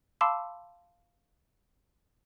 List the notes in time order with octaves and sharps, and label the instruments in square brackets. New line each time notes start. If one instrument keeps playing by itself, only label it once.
[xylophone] F5 A5 B5 C6 D6 E6